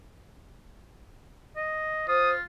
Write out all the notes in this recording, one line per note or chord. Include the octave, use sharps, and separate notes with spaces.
D#5
F4 C5 D#6